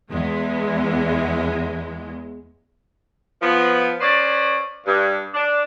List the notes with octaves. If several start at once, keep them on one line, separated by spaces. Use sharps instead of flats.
E2 G#3
F3 B3
C#4 B4 C5 D5
G2
D4